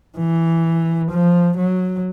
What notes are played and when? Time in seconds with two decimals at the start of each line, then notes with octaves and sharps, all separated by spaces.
0.18 E3
1.11 F3
1.58 F#3